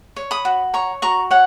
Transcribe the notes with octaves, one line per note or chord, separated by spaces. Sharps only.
C#5
B5 D#6
F#4
C#5 A#5 C#6
F#4 A#5 C#6
C#5 F#5